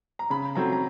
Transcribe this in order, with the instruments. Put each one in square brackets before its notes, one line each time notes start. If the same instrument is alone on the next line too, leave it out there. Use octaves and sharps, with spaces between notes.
[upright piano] A#5
C#3 B5
F#3 A3 C4 A#5
A#5